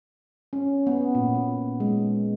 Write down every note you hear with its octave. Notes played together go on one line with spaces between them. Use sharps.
C#4
B3
A#2
A#2
G#3